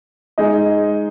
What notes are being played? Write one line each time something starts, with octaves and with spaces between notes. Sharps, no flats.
G#3 D#4 G#4 D#5